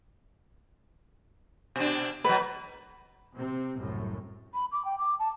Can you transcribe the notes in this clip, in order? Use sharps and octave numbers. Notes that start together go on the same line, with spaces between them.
B2 D4
B2 F#3 B4
C3 C4
C2 F#2 A2
B5
D6
G5
D6
A5